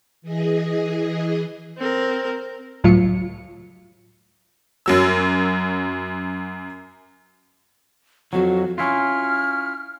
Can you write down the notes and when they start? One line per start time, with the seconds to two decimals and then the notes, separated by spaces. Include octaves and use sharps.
0.22 E3 G#4 D#5
1.77 C4 A#4
2.84 C#2 A2 F#3 F4 C#7
4.86 F#2 F#3 E6
8.33 F2 F#3 F#4
8.78 C#4 E4 F4 F6